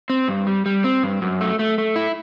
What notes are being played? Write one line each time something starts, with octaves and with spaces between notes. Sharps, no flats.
C4
G2
G3
G3
C4
G2
F#2
A3
A3
A3
E4